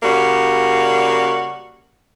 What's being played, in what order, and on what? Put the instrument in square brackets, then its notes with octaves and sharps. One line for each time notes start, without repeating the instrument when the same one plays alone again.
[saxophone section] C#3 G3 A#3 F#4